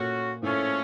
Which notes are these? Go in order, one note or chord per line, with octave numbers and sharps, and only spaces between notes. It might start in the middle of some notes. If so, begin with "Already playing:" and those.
Already playing: A#2 A3 C#4 F#4
A2 F3 A3 C#4 F4 A4